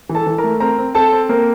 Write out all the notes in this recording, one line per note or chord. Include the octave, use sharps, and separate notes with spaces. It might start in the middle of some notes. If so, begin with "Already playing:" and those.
E3
A4 A5
E3
A#4 A#5
A3
C4 A#4 A#5
C4
C4 A4 A5
C4
A#3 C4 A#4